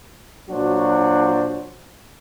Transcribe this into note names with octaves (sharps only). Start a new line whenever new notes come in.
A#2 F#3 D4 F#4 C5